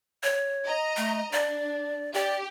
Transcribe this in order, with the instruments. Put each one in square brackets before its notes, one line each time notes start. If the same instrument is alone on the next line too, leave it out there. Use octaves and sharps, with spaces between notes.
[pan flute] C#5
[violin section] D#5 A#5
[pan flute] A3
[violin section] D4 [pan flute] D5
[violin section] G4 [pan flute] D5